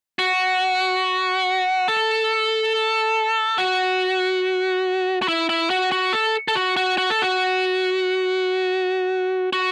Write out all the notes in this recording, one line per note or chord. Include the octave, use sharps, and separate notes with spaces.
F#4
A4
F#4
F#4
E4
E4
F#4
F#4
A4
A4
F#4
F#4
F#4
A4
F#4
F#4